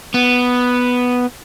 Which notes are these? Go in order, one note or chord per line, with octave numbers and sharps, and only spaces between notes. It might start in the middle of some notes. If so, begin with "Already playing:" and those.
B3